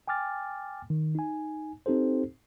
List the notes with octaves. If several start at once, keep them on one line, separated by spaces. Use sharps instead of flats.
G5 G#5 D6 F6 A6
D#3
D#4 G#5
C4 D#4 G4 A4 C5